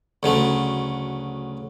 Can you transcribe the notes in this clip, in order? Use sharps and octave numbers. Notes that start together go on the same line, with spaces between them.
D2 C#3 F#3 A3